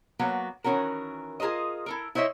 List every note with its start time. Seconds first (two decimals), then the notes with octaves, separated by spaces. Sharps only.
0.19 F#3 A#3 B3 F#4
0.64 D#3 E3 C#4 F#4 A#4
1.40 F4 G#4 A#4 C5 D#5
1.86 E4 A4 A#4
2.15 E4 C5 C#5 D#5 E5